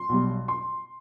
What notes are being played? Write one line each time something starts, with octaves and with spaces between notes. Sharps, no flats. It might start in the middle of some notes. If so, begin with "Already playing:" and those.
Already playing: C6
B1 B2 G3
C6